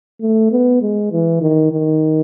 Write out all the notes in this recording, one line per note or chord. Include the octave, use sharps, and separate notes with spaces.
A3
B3
G#3
E3
D#3
D#3